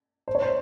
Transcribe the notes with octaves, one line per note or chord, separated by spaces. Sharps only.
C5
C#5
C5